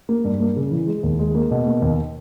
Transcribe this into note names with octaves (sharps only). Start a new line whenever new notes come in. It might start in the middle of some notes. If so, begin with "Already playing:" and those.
A#3
G2
A#3
C#3
E3
G#3
D#2
G#3
A#3
B2
A#3
D#2